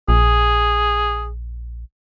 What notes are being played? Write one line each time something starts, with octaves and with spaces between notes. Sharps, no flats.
A#1 G#4